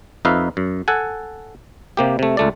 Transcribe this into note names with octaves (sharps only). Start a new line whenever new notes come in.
F2 D#4 B4 E5 F5
F#2
A4 F#5 G#5
C3 A#3 G4
C3 A3
C#2 A3 D5